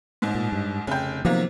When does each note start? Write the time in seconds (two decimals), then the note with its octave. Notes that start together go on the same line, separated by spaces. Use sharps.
0.22 A1 G#2
0.35 A#2
0.52 G2
0.87 F1 C#3 G5
1.25 C3 D#3 F3 F#3 A#3 B3